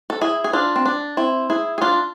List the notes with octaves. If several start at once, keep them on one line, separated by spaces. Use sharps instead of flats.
A4
E4 G#4
G#4
D4 F4
C4
D4
C4 E4
E4 G#4
G#4
D4 F4